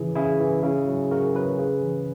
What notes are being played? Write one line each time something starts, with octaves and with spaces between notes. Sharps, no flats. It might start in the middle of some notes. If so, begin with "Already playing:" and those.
Already playing: C#3 E3 E4 G#4
C#3 E4 G#4
E3
C#3
F#3
C#3 F#4 A#4
F#3 G#4 B4
C#3
E3